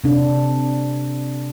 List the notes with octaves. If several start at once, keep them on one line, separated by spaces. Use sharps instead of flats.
C3 D4